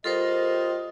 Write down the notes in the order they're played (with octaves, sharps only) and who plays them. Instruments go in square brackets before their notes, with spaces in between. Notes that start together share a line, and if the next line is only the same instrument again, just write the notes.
[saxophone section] G3 F4 D#5 [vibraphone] A4 A#4 C5